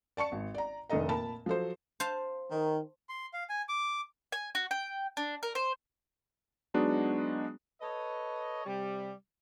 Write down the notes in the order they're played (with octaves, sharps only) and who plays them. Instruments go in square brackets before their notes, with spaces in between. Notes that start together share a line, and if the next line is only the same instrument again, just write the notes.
[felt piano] D5 A5 C#6 C#7
G#1
D5 A#5
F1 D#3 D4 A4 D#5 A#5
A#2 A#4 A5 B5
F3 F#3 A4 C5
[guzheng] C5 F5 A5
[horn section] D#3
[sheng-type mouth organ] C6
F5
G#5
D6
[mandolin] G#5
F#4
G5
D4
A#4
C5
[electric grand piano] F#3 G#3 B3 D4 D#4 F#4
[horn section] A4 B4 C#5 D#5
C3 G3